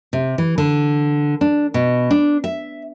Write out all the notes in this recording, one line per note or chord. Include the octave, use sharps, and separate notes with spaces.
C3
E3
D3
D4
B2
D4
E5